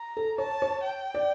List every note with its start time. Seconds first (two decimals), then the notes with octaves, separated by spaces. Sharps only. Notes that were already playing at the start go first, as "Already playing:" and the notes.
Already playing: A#5
0.17 A4
0.38 C#5 A5
0.62 C#5
0.83 G5
1.14 D5